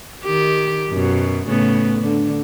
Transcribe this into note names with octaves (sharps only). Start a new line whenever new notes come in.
D#3 G4
F#2 B2
A2 C#3 B3
D3